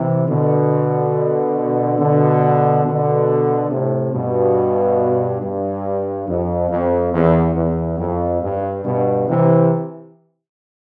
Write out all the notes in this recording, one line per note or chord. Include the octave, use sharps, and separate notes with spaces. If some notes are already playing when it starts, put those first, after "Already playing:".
Already playing: C3 E3
B2 D3
B2 D3
B2 D3
A2 C3
G2 B2
G2
F2
F2
E2
E2
F2
G2
G2 B2
C3 E3